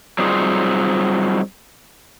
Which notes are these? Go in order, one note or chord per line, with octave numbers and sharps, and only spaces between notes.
F#3 G3 C4 D#4 F4 G#4